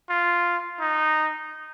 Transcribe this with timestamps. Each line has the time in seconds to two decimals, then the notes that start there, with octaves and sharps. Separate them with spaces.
0.09 F4
0.80 D#4